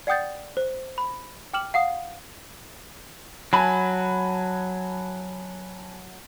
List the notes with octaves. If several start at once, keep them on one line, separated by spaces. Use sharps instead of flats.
D5 F#5 G5 D#6 G6 A6
C5
B5
G5 D6 F6 E7 F#7
F5 F#5 D#6
F#3 G#5 A5 B5